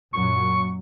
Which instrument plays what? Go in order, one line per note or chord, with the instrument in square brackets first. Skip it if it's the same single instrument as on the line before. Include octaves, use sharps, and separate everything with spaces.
[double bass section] F#2 A#2 F#3 [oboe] C#6